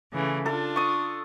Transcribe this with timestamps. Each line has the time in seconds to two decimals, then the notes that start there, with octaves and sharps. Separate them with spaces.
0.13 C#3 E3 A3
0.46 D4 F4 A4
0.76 C#6 D#6